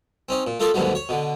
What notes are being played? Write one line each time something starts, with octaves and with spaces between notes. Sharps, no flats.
C4 C#4 D#4
A#2
A3 F4 A4 A#4 D5 D#5
D#2 G#2 B2 D3 F#3 G3
C#5
B2 D3